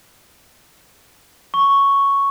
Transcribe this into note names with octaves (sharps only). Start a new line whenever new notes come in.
C#6